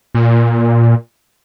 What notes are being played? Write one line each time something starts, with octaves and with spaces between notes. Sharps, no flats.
A#2